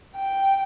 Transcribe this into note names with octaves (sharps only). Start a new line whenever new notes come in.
G5